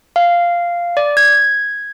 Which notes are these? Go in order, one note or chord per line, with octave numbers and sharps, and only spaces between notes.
F5
D5
G#6